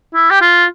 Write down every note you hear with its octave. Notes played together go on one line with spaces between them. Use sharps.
E4
G4
F4